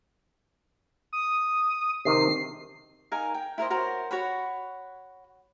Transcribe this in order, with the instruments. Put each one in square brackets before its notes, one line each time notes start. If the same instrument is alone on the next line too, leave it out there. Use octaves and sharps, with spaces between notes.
[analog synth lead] D#6
[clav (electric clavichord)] C3 D#3 [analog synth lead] C7
[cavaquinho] D#4 A#4 F5 G#5
G5
E4 A#4 C5 D#5
F#4 A#4 C5 C#5
F#4 C#5 F#5 B5